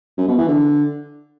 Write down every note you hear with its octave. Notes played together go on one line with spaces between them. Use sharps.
F#2
B2
E3
D3